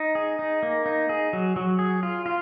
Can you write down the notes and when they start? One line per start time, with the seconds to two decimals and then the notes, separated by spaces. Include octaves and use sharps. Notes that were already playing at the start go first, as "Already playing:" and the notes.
Already playing: D#4
0.15 G#4
0.39 D#4
0.63 A#3
0.86 D#4
1.09 G#4
1.33 F#3
1.56 F#3
1.79 G#4
2.03 F4
2.26 F4